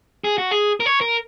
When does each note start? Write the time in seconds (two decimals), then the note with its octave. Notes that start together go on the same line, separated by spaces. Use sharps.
0.24 G#4
0.38 F#4
0.51 G#4
0.80 A#4
0.86 C#5
1.01 A#4